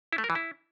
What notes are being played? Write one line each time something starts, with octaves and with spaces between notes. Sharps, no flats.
E4
A3
A#4
E3
E4